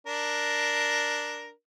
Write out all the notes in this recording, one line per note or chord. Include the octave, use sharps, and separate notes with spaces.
D4 A#4